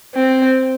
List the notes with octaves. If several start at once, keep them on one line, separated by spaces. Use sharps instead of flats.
C4